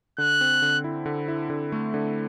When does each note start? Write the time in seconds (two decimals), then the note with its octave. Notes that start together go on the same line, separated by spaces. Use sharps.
0.18 D3 F#6
0.41 C4
0.62 D3
0.84 E4
1.06 D3
1.28 E4
1.50 D3
1.72 A3
1.94 D3